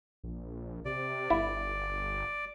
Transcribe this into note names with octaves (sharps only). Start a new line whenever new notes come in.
A#1
C3 D5
G1 E4